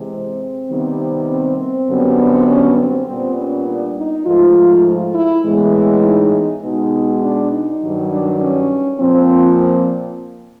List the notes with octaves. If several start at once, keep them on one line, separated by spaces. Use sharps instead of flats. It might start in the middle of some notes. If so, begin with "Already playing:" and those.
Already playing: C3 E3 G#3
C4
C3 D#3 G3 B3
C4
C4
F#2 D3 G3 B3
C4
C#4
C4
A#2 G3 B3 C4
C#4
D4
D#4
G#2 F3 A3 F4
E4
A2 E3 G#3 B3
D#4
B2 G#3 B3 D#4
D4
D#4
G2 D#3 F#3
D4
C#4
A#2 F3 A#3 C4
C4